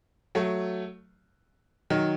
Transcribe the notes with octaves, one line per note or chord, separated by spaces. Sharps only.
F#3 A3
D#3 F#3